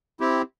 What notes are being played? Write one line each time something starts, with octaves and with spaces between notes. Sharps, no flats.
C4 E4 G4